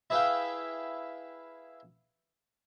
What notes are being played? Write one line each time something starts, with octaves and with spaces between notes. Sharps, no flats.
E4 G#4 B4 E5 F5 G5